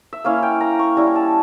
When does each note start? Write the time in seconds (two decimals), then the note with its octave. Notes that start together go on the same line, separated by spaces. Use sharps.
0.13 E5
0.24 A#3 C#4 E4 F5
0.43 G5
0.61 A#5
0.79 C#6
0.97 G3 C#4 E4 A#5
1.16 A5